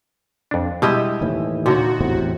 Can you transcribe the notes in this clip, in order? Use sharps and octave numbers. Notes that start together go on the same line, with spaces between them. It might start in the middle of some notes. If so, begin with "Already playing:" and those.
F2 D4
B2 G3 G#3 E4 G4 D#5
D#2 A2 E3
A#2 D3 D#3 F#4 C#5
E2 A2 C3